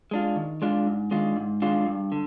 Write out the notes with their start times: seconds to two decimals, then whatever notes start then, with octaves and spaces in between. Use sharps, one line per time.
0.11 G#3 D4 F4
0.36 D#3
0.62 G#3 D4 F4
0.87 G#2
1.11 D#3 G#3 D4 F4
1.36 G#2
1.62 D#3 G#3 D4 F4
1.86 G2
2.12 D3